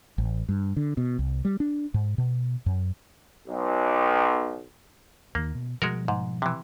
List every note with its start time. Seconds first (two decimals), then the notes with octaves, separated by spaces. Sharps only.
0.18 A1
0.49 G2
0.76 D3
0.97 B2
1.19 C2
1.45 G3
1.60 D4
1.94 G#2
2.18 B2
2.66 F#2
3.47 B1
5.35 D#2 D#3 A#3
5.55 B2
5.82 B2 F3 G3 G#3 F#4 A#4
6.08 G#2
6.42 C3 E3